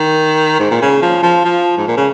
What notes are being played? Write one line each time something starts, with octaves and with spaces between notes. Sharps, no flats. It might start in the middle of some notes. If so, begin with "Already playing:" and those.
Already playing: D#3
G#2
A#2
C#3
F3
F3
F3
G#2
A#2
C#3